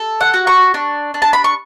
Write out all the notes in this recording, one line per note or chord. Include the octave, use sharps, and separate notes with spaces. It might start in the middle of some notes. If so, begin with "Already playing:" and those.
Already playing: A4
F#5
F#4
C#6
D4
D4
A5
B5
C#6